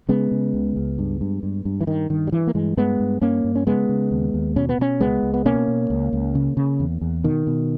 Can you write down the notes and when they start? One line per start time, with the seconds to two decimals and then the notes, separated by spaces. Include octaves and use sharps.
0.09 C#3 G#3 B3
0.32 C#3
0.54 C#2
0.76 C#2
0.99 G2
1.21 G2
1.43 G2
1.65 G2
1.81 E3
1.87 G2 D#3
2.10 G2 D#3
2.27 G3
2.32 G2 E3
2.47 A#3
2.54 G2 E3 G#3
2.77 G2 G#3 B3
3.00 G2
3.22 G2 A#3 C#4
3.44 G2
3.55 C#4
3.67 C#3 G#3 B3
3.89 C#3
4.11 D#2
4.34 D#2
4.56 B2 C#4
4.69 B3
4.79 B2 A#3 C#4
5.00 C#2 G#3 B3
5.23 C#2
5.34 B3
5.46 B2 A#3 C#4
5.68 B2
5.90 C#2
6.13 C#2
6.35 C#3
6.57 C#3
6.80 E2
7.01 E2
7.24 B2 D#3
7.47 B2